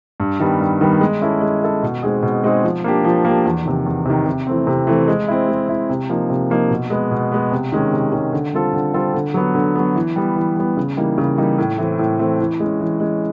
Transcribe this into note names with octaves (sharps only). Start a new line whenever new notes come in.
G2
D#3 G3 B3
G2
D#3 G3 B3
G#3
C#4 E4 A4
G#3
C#4 E4 A4
B2
G#3 C4 D#4 G#4
B2
G#3 C4 D#4 G#4
F3
A#3 D4 G4
F3
A#3 D4 G4
E2
C3 D#3
E2
C3 D#3
C3
E3 A3 C4
C3
E3 A3 C4
G#3
C4 E4
G#3
C4 E4
C3
F3 A#3 D#4
C3
F3 A#3 D#4
B2
G#3 B3
B2
G#3 B3
C3
D#3 G#3 C#4
C3
D#3 G#3 C#4
D3
G3 C4 F4 A4
D3
G3 C4 F4 A4
D3
F#3 B3
D3
F#3 B3
E3
G3 B3
E3
G3 B3
C#3
E3 G3 A#3 D#4
C#3
E3 G3 A#3 D#4
A2
E3 A3 C4
A2
E3 A3 C4
E3
G#3 C#4
E3
G#3 C#4